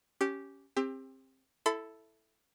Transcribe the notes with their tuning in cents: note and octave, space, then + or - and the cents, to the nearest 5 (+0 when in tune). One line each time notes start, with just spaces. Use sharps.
C#4 +0 G4 -10
C4 +20 G4 +35
E4 +0 A4 +0 B5 +45